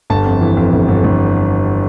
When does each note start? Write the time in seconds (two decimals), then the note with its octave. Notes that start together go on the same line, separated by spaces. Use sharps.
0.10 G1 A5
0.25 F2
0.41 E3
0.57 F2
0.73 G1
0.88 G1
1.04 G1